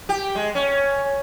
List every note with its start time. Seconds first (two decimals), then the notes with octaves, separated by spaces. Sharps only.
0.09 G4
0.35 G#3
0.55 C#4